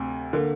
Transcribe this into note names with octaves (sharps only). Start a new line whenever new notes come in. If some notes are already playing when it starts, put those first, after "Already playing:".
Already playing: D2 C3
D3 A#3